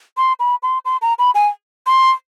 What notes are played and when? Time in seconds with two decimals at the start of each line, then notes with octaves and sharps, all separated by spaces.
0.17 C6
0.39 B5
0.63 C6
0.85 C6
1.02 A#5
1.19 B5
1.35 G#5
1.86 C6